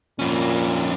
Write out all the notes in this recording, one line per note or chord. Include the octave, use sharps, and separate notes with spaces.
F2 A#2 C#4